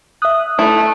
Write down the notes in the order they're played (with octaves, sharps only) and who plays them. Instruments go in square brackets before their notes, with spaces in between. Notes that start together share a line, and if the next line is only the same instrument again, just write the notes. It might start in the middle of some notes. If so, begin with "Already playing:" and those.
[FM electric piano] E5 F#6 [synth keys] D#6
[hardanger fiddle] A3 [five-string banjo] E4